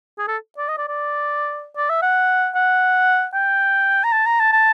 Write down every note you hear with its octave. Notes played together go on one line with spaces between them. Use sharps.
G#4
A4
D5
D#5
D5
D5
D5
E5
F#5
F#5
G5
A#5
A5
A#5
A5
A5